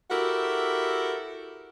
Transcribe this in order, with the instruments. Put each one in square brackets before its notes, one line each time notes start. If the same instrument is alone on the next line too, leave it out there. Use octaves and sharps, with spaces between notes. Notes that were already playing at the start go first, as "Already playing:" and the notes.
[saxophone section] E4 F#4 G4 A4 A#4